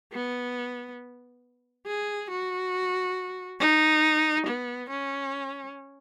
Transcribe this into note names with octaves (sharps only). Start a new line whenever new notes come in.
B3
G#4
F#4
D#4
B3
C#4